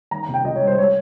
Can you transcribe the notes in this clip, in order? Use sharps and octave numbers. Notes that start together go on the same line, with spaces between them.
D#3 A#5
A#5
C3
G5
C#2 D#5
C#5
G3
C5
G#3 C#5